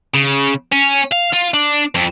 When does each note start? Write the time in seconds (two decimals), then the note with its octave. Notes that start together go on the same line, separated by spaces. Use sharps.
0.15 C#3
0.72 C#4
1.11 F5
1.33 F4
1.54 D4
1.95 F2